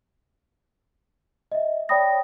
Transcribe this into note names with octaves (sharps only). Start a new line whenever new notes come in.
D#5 E5
C#5 D5 G5 B5 D#6 A#6